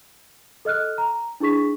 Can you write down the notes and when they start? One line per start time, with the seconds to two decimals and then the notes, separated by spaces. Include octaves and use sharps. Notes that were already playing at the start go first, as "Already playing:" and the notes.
0.65 A4 D#5 F6 F#6
0.98 A#5
1.40 D4 E4 G#4 C#6 B6